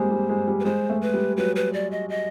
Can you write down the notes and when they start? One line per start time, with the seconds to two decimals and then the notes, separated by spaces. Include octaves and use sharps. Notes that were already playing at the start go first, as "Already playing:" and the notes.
Already playing: G3 G#3 A#3 C4 C5
0.11 G3
0.29 G#3
0.47 G3
0.60 B4
0.65 G#3 C5
0.90 A3
1.02 B4
1.14 G3
1.37 F#3 B4
1.56 B4
1.73 D5
1.91 D#5
2.09 D#5